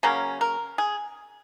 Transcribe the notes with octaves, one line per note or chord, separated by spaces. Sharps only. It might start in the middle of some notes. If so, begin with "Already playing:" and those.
C#3 F#3 A#3 C#4
A#4
G#4